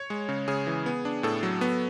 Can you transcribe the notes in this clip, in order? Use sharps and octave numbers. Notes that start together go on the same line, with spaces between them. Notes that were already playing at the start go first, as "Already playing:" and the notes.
Already playing: C#5
G#3
C#3
C#3 G#4
E3
B3
D4
A2 A4
F#3
B3